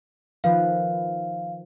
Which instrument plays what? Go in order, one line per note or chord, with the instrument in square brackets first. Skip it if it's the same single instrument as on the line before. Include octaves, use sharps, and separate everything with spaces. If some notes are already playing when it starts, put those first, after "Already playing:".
[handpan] D#3 F3 B4 [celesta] F5